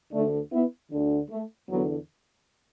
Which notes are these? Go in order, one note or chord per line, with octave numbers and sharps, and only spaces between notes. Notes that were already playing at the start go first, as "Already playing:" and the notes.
D2 D3 A3 D4
B3 E4
D2 D3
A3
E2 D3 F#3 B3